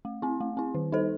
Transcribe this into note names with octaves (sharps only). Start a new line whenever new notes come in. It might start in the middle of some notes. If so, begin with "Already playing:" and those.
A3
C4 E4
A3
C4 E4
D#3
G3 D#4 A4 C5